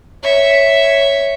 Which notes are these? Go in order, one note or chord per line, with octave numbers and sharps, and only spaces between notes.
C#5 E5